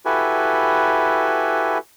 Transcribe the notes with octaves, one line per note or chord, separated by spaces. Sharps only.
E4 F#4 G4 A4 B4 G#5